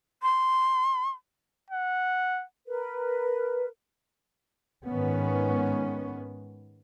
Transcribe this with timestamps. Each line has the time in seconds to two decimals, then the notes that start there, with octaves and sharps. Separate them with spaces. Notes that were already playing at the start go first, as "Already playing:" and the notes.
0.23 C6
1.70 F#5
2.67 A#4 B4
4.88 G#2 D#3 B3 C#4